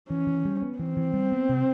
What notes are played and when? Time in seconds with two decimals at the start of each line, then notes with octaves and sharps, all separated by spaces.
0.10 E3 C#4
0.27 E3
0.45 G3
0.62 B3
0.79 E3 C4
0.97 E3
1.14 G3
1.32 B3
1.49 C3